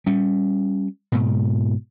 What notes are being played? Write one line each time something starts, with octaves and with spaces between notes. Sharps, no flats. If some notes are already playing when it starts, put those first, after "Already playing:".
G3 C#4
G#2 B2